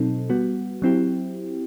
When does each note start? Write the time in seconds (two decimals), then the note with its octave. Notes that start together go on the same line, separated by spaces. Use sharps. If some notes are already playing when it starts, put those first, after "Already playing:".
Already playing: B2 F#3 C4 D#4 A4
0.30 G3 B3 F#4
0.82 F#3 C4 E4 G4